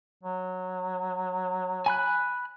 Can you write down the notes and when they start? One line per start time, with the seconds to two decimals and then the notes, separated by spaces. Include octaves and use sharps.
0.23 F#3
1.86 G#5 B5 F#6